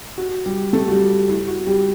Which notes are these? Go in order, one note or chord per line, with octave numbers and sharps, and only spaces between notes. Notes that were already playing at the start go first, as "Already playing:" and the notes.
F#4
G3 G4
A3 A4
F#4
G3 G4
E4
F#4
G3 G4